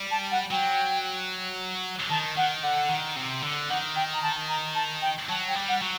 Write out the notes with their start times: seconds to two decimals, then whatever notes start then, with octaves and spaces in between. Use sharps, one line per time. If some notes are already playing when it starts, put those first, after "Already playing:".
Already playing: G3
0.11 A5
0.32 F#5
0.51 F#3 G5
2.10 D#3 A5
2.37 D#3 F#5
2.63 D3 F#5
2.89 D#3
3.16 C3
3.43 D3
3.70 D#3 F#5
3.96 G5
4.13 A#5
4.23 A5
4.49 A#5
4.75 A5
5.02 G5
5.29 F#3 A5
5.48 G5
5.55 G3
5.69 F#5
5.81 F#3